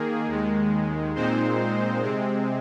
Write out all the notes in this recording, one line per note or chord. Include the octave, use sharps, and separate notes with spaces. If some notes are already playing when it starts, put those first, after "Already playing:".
Already playing: D#3 A#3 G#4
D#2 D#3 G#3
A#2 G#3 C4 D#4 C5
C3 G#3 C4